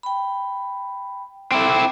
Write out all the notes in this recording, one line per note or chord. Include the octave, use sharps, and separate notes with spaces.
G5 B5
C4 E4 A4 D6